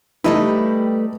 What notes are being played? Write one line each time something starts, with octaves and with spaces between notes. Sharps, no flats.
G3 A3 D#4 E4 G4 B4